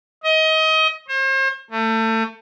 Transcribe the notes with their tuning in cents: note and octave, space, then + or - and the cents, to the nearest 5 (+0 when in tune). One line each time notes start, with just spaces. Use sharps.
D#5 +25
C5 +40
A3 +30